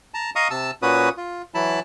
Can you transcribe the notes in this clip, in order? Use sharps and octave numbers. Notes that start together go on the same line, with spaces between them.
A5 A#5
D#5 F5 A#5 C#6 D#6
C3 A5 E6
A#2 C#4 F#4 B4 D#6
F4
E3 F#3 E4 A5 B5